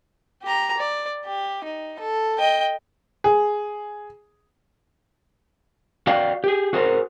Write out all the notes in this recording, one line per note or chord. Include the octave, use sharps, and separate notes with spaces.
G4 A#5
D5
G4
D#4
A4
D#5 G5
G#4
F#4 D5 F5 G5
G4 G#4
F#4 G#4 A#4 C5